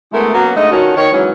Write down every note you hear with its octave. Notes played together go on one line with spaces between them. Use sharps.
D3 G#3 A3 B3 E4 A#4
F#3 A#3 B3 C#4 F#4
G#2 D3 A3 D#5
D3 D#3 C#4 F4 F#4
D#3 C#5
G#2 E3 F#3 C#4